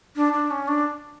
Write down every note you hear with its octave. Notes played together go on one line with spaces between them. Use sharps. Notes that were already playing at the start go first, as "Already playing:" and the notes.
D4
D4
C#4
D4